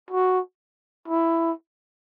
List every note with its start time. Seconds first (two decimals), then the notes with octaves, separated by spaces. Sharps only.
0.11 F#4
1.08 E4